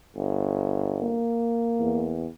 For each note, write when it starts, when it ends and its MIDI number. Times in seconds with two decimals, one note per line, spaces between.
0.16 1.19 31
1.01 2.28 58
1.79 2.28 40